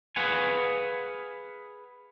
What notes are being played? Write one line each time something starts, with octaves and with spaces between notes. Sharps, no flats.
G#4 B4 F5 F#5 G#5